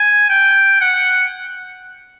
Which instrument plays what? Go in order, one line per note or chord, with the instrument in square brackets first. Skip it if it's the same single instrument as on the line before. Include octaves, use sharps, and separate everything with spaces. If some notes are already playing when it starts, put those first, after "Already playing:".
Already playing: [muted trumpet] G#5
G5
F#5